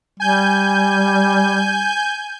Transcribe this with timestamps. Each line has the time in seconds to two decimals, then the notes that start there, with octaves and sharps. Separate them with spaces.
0.20 G3 G#5 G6